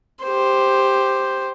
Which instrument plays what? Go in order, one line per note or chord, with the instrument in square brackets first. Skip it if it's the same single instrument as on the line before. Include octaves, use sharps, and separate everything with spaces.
[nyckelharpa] G4 C5